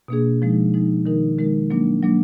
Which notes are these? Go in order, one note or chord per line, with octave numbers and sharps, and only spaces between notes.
B2 A#3 D4 G#4
F3 G#3 D#4
F3 G#3 D#4
D#3 G#3 D#4 A#4
D#3 G#3 D#4 A#4
F#3 A#3 D4
F#3 A#3 D4